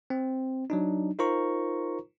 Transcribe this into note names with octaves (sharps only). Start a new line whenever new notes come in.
C4
F#3 D4 D#4
D#4 F4 A#4 C5 A#5 C#6